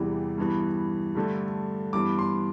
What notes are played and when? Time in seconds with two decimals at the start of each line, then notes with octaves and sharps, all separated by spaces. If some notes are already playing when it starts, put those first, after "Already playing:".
Already playing: E2 C3 E3 G3
0.38 G2 E3 B3
1.15 G2 D3 A3
1.93 G2 E3 B3 D6
2.19 C6